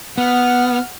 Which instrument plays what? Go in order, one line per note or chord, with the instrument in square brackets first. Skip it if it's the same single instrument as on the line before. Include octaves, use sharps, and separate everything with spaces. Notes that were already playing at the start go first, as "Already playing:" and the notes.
[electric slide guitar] B3 [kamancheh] F#5 F6